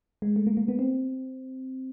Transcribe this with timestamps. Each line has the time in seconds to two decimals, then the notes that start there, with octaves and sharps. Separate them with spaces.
0.22 G#3
0.36 A3
0.47 A#3
0.57 A#3
0.68 B3
0.79 C4